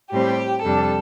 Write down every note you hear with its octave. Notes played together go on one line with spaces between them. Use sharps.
A2 G3 C4 G4
F2 C3 G3 D4 A4